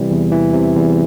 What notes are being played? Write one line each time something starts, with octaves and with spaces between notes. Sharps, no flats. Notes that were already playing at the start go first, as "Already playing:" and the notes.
Already playing: C3 E3 G3
E2
E3
C3
E2